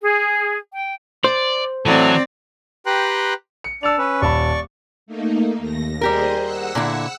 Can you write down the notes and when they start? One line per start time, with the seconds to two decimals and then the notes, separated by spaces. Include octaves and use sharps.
0.02 G#4
0.72 G5
1.24 C5 D5
1.86 A2 E3 F#3 C4 A4 D5
2.86 G4 B4 G5 A#5 C6 F#6
3.64 C#7
3.83 D4 D5 E6 C#7 F7
3.98 C#4 B4
4.21 D#1 D5 A5 B5 C#6
5.06 A3 A#3 D#4
5.58 D#2 A#6
6.01 G3 G4 G#4 A#4 C5 D#5
6.41 F#5 E6 F#6
6.75 A#2 D3 E4